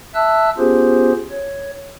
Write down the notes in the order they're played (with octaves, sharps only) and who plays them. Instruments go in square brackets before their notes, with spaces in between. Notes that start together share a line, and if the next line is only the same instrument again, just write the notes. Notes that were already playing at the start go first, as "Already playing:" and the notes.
[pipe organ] E5 A5 E6 F#6
B3 C#4 F4 G4 G#4 C5
C#5